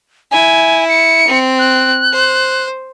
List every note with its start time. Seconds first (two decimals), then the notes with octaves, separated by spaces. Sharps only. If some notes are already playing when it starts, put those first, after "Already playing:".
0.31 E4 G#5
0.89 C#7
1.27 C4
1.59 F#6
2.12 C5